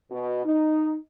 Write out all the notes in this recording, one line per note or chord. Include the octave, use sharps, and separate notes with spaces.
B2
D#4